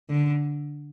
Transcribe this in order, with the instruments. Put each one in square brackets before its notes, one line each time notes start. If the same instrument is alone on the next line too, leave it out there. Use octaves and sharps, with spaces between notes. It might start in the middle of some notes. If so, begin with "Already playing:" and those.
[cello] D3